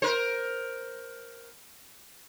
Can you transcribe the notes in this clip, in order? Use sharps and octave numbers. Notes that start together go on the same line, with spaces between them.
A#4 C5